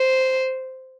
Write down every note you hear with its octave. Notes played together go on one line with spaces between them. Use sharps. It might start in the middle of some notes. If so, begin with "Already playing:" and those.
Already playing: C5